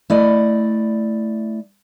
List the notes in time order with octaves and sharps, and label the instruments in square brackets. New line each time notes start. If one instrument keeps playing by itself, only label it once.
[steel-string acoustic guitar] A3 E4 D5 D#5